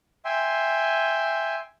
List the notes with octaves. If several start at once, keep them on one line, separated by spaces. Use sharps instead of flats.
E5 G5 G#5 C6